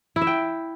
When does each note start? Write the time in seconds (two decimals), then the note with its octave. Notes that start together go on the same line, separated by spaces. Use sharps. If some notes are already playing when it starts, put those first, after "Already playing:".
0.16 E4
0.21 E5
0.27 G5